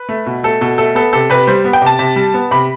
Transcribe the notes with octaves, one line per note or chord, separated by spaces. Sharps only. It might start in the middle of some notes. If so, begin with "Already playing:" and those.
Already playing: B4
A3
B2
A3 A4
B2 A4
A3 A4
B3 A4
C3 A4
C3 B4
G3 C5
B3
G5
C3 A5
C3
G3
B3
C3 B5